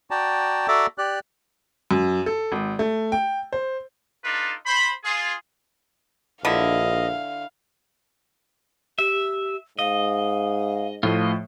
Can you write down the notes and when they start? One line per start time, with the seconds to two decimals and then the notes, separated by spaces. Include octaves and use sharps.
0.11 F#4 D5 G5 A5 A#5
0.68 F#4 A4 D5 E5 A#5 D6
0.98 G4 D5 F#6
1.91 F#2
2.26 A4
2.52 G#1
2.79 A3
3.12 G5
3.53 C5
4.25 D4 D#4 F4 A4 B4
4.66 C5 B5
5.04 F4 G#4
6.45 A#1 D3 E4 D#5 F5
8.99 G4 E5
9.79 G#2 D#5 F5
11.03 A2 F3 A3 F4 D#5